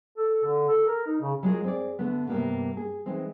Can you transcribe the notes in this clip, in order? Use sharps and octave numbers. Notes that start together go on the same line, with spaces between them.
A4
D3
A4
A#4
D#4
C#3
F#3 G#3 F4 G4 G#4 A#4
C4 G#4 D5
D3 A3 B3
G2 C3 E3 G3 A#3 B3
G#4
D#3 E3 G#3 C4